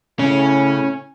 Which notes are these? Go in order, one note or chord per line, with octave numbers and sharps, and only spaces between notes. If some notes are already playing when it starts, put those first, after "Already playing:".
A2 C#3 C#4